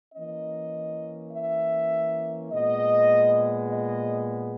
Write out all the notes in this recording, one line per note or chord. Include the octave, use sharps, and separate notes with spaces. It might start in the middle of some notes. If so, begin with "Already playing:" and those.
E3 A#3 C#4 D#5
E5
A#2 G#3 B3 D#5
D#5